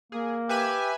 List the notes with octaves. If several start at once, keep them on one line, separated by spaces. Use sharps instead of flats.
A#3 G#4
G4 B4 E5 G#5